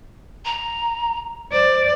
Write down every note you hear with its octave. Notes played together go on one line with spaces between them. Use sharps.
A#5
C5 D5